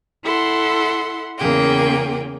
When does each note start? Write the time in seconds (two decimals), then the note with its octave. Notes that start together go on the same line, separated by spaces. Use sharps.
0.24 E4 A4 F#5 C6
1.38 E2 C#3 A#3 G#4 G5